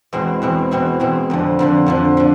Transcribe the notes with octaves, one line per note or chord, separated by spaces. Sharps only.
E2 B2 G#3 C4 E4
E2 B2 G#3 C4 E4
E2 B2 G#3 C4 E4
E2 B2 G#3 C4 E4
F2 D3 F3
F2 D3 F3
F2 D3 F3
D3 F3